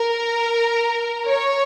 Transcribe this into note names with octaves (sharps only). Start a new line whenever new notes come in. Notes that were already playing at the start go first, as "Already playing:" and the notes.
Already playing: A#4
C#5